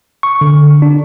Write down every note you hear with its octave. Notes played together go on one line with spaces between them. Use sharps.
C#6
D3
D4